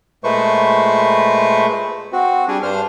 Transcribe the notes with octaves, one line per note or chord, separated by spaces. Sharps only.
A#2 G#3 A3 B4 C5 C#6
C4 F#4
G3 D4 G4 G#4
G2 D4 C5 F6